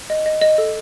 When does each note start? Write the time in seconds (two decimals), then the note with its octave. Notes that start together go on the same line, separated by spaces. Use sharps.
0.10 D#5
0.26 D#5
0.41 D#5
0.58 A4